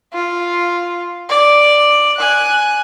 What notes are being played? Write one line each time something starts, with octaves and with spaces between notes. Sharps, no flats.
F4
D5
G#5 F#6